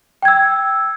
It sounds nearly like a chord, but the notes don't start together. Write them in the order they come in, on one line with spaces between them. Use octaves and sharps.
G5 G#6 E6